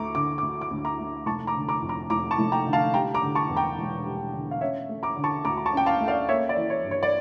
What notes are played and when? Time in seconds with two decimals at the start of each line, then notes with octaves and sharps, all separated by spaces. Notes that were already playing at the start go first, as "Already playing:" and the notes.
Already playing: D2 A3 A#5 C#6 D6
0.15 D3 D6
0.38 D2 D6
0.61 D6
0.71 D2
0.85 A#5 D6
0.99 A3
1.26 F1 A5 C#6
1.47 A#5 D6
1.55 D3
1.69 A#5 D6
1.82 F2
1.89 A#5 D6
2.10 F1 A#5 D6
2.31 A5 C#6
2.38 F1
2.52 G5 A#5
2.66 D3
2.73 F5 A5
2.94 G3 G5 A#5
3.14 A#5 D6
3.22 D3
3.35 A5 C#6
3.50 E2
3.56 G5 A#5
3.78 E1
4.06 G3
4.33 D3
4.51 F5
4.61 C#4 C#5 E5
4.89 A3
5.03 A#5 D6
5.17 D3
5.24 A5 C#6
5.45 D2 A#5 D6
5.58 A#5
5.66 A5 C#6
5.73 C#4 G5
5.86 F5 A5
6.01 A3
6.08 D5 F5
6.28 A#3 C#5 E5
6.49 D5
6.56 E3
6.70 C#5
6.84 G2
6.91 C#5
7.03 D5